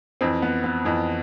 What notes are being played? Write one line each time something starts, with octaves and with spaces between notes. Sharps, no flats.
F2 E3 C4
B3
B3
F2 E3